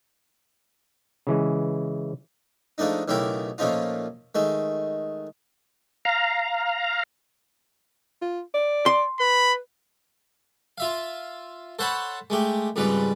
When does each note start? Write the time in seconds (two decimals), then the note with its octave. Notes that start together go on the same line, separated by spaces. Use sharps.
1.27 C#3 E3 G#3
2.78 F3 G#3 A3 D4 D#4
3.08 B1 C#3 A3 E4 G4 A#4
3.58 A#2 F3 A3 C#4 D#4 F4
4.35 D#3 G#3 A3
6.05 F5 A#5
8.22 F4
8.54 D5
8.86 C6
9.20 B4 B5
10.78 F4 E5 F5
11.79 A4 C5 C#5 F#5 A5 B5
12.30 G#3 A3 G4
12.76 F2 G#2 C#3 G3 B4